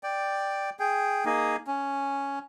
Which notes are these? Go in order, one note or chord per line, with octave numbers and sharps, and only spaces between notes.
D5 G5
G#4 G5
A#3 D#4 G#4
C#4